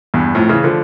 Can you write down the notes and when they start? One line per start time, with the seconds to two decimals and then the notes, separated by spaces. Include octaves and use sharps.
0.14 E2 G2
0.35 F2 A2
0.49 C#3 E3
0.64 D3 F3